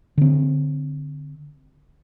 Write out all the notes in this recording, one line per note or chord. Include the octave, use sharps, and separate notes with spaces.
D3 C4